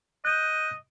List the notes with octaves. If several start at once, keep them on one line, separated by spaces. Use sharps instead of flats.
D#5 F#6 G6